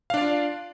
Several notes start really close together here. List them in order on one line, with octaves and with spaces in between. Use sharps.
F5 D4 D5 F4